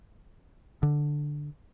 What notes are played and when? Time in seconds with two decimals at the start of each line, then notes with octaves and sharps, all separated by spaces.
0.83 D3